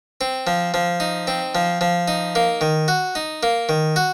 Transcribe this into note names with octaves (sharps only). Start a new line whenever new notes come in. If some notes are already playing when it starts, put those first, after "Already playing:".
C4
F3
F3
D#4
C4
F3
F3
D#4
A#3
D#3
F#4
D#4
A#3
D#3
F#4